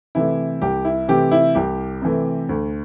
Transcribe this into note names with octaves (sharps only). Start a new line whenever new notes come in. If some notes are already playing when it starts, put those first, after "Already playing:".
C3 E3 A3 E4
C2 G4
E4
C3 E3 A3 G4
E4
C2 G4
C3 E3 A3
D2